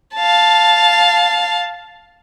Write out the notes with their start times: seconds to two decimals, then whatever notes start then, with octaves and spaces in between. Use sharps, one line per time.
0.15 F5 A5